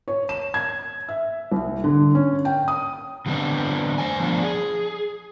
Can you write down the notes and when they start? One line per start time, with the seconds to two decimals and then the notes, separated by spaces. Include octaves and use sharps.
0.08 C#5
0.29 E7
0.54 G#6
1.09 E5
1.52 C2
1.84 D3
2.15 C#4
2.45 G5
2.68 D#6
3.26 D3 G3 B3 C4 D4
3.98 C5 G#5
4.20 F3 B3 D4 F4
4.42 G#4